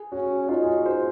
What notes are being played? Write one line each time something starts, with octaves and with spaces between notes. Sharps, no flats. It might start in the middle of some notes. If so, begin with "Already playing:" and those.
Already playing: G#4
C#4 F#4
D#4 F4
G#4
F#4
C5